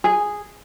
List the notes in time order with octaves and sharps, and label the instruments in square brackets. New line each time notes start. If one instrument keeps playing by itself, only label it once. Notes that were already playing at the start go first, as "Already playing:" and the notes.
[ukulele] G#4